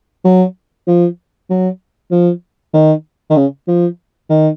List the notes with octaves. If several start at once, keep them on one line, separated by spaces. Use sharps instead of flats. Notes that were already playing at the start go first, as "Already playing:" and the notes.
F#3
F3
F#3
F3
D#3
D#3
C#3
F3
D#3